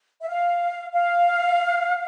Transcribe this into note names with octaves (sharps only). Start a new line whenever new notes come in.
E5
F5
F5